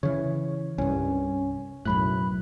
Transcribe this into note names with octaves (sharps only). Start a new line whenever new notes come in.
C#3 E3 C#5
C2 G2 C#4
B1 F#2 A2 B5 F#6